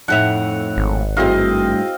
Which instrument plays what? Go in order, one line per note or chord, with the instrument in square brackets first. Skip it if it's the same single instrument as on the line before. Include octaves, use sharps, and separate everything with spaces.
[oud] F2 A2 E5 [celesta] D#4 F7 [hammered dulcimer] F#5
[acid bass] G#1
[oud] G2 A3 [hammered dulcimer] C4 D#5 F5 [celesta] E4 F#4 G#4